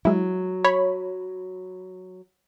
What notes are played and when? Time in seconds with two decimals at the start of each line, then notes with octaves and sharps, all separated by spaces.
0.05 F#3 G#3 E4
0.64 C#5 B5